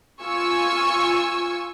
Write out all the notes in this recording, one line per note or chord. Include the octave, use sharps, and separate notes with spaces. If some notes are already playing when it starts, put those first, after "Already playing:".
F4 G#5 C#6 E6